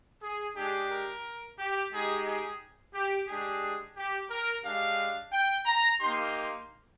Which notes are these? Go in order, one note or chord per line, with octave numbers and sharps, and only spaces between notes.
G#4
G#3 D4 G4 G#4
A#4
G4
G#3 D#4 G4 G#4
G#4
G4
G#3 D4 G4 G#4
G4
A#4
G#3 D4 G4 F5
G5
A#5
A#3 D#4 G4 C6